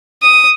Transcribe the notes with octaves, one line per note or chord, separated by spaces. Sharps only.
D#6